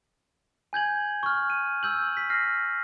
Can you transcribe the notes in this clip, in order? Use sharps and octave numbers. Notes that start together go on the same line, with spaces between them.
G#5 G6 G#6 F#7
C#6 F6
D#7
E6 G6 F#7
B6
F6 A#6 C7